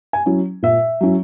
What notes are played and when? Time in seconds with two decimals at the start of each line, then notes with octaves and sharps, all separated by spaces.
0.13 G#5
0.26 F#3 C#4 E4
0.62 A#2 E5
1.01 F#3 C#4 E4